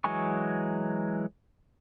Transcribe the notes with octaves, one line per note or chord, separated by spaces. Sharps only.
E3 F#3 G#3 G#5 C#6